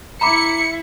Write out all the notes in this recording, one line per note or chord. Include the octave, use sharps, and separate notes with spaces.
E4 E5 A#5 B5 D6 C#7